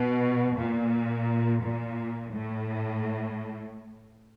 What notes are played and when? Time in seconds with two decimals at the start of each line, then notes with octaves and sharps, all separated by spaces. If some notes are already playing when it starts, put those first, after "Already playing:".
Already playing: B2
0.58 A#2
1.63 A#2
2.33 A2